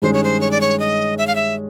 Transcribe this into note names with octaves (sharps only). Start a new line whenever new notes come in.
G2 D#3 G#3 C#4 C5
C#5
C5
C#5
D5
C#5
D#5
E5
F5
E5